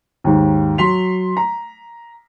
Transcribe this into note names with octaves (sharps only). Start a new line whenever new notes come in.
D#2 G#2
F#3 C6 B6 F7
A#5